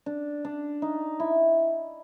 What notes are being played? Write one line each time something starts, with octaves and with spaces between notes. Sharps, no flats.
D4
D4
D#4
E4